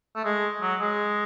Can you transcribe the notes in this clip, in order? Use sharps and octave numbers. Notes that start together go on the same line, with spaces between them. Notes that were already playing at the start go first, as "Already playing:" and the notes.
A3
G#3
F#3
G#3